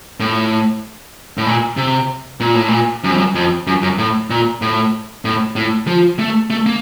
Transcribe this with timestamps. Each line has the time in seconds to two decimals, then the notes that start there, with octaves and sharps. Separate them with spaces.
0.20 A2
1.38 A2
1.46 A#2
1.77 C3
2.40 A#2
2.55 A2
2.68 A#2
3.04 F#2
3.10 F2
3.17 F#2
3.35 F2
3.67 F#2
3.82 F#2
3.98 A2
4.30 A#2
4.62 A2
5.25 A2
5.56 A2
5.87 F3
6.19 A3
6.50 A3
6.66 A#3